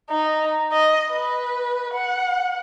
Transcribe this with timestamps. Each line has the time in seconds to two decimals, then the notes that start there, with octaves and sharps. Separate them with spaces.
0.10 D#4
0.72 D#5
1.12 B4
1.94 F#5